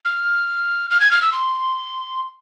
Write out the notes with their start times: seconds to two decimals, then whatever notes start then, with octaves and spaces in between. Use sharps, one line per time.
0.05 F6
0.90 F6
1.00 G#6
1.11 F6
1.22 E6
1.32 C6